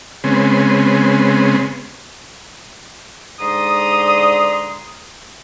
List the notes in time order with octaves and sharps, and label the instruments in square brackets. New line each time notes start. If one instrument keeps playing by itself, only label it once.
[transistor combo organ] C#3 G#3 B3 C4
[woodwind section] G#2 D3 D5 A#5 C6 D#6